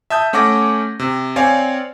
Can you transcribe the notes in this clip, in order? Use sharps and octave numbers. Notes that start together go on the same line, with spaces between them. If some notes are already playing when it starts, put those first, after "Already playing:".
E5 A5 D#6 G6
A3 C#4 F#5 D6 A#6
C3
C4 C#5 D5 F5 G#5